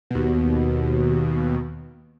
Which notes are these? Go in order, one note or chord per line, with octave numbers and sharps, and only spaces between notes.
D#2 B2